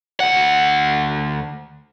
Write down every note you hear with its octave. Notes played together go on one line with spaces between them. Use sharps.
D2 F#5